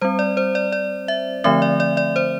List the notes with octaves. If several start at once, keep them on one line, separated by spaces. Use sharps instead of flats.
G3 C4 C5
D5
C5
D5
D5
E5
D3 F3 A3 C4 E5
D5
D5
D5
C5